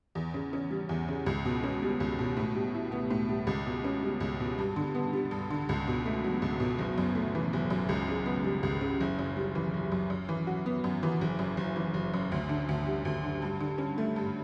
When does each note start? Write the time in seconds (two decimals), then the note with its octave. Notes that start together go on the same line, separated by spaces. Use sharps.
0.15 E2
0.34 C#3
0.53 C#4
0.71 G3
0.89 E2
1.09 C#3
1.26 C#2
1.45 B2
1.64 C#4
1.82 G3
2.00 C#2
2.19 B2
2.37 A2
2.55 G3
2.74 E4
2.92 B3
3.10 A2
3.29 G3
3.47 C#2
3.66 B2
3.84 C#4
4.03 G3
4.20 C#2
4.40 B2
4.59 G2
4.76 D3
4.95 B3
5.13 G3
5.31 G2
5.50 D3
5.69 C#2
5.87 B2
6.06 A3
6.24 F#3
6.42 C#2
6.60 B2
6.79 F#1
6.98 F#2
7.15 A3
7.35 E3
7.53 F#1
7.70 F#2
7.89 C#2
8.08 C#3
8.26 B3
8.44 G3
8.63 C#2
8.81 C#3
9.01 F#1
9.19 F#2
9.37 G3
9.55 E3
9.74 F#1
9.92 F#2
10.10 F#2
10.29 E3
10.47 F#4
10.66 B3
10.84 F#2
11.03 E3
11.21 F#1
11.39 F#2
11.57 F#1
11.76 E3
11.94 F#1
12.14 F#2
12.32 D2
12.49 D3
12.69 D2
12.86 G3
13.05 D2
13.24 D3
13.42 G2
13.60 D3
13.78 C#4
13.98 A3
14.16 G2